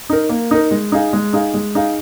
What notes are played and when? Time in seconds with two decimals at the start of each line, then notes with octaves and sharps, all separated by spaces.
0.10 D#4 A#4
0.29 A#3
0.51 D#4 A#4
0.71 G#3
0.92 D#4 G#4 F5
1.13 G#3
1.33 D#4 G#4 F5
1.54 G#3
1.75 D#4 G#4 F5